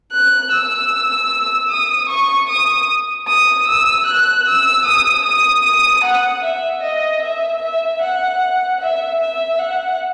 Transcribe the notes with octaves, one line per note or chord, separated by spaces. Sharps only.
F#6
E6
D#6
C#6
D#6
D#6
E6
F#6
E6
D#6
D#6
D#6
F#5
E5
D#5
E5
E5
F#5
E5
E5
F#5